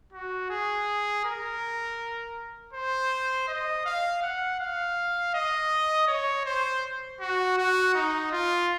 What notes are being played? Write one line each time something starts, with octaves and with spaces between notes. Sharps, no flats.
F#4
G#4
A#4
C5
D#5
F5
F#5
F5
D#5
C#5
C5
F#4
F#4
D#4
F4